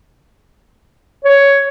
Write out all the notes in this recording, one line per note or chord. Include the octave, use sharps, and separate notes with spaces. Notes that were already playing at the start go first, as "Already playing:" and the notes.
C#5